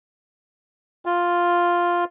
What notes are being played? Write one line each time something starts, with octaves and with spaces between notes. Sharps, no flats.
F4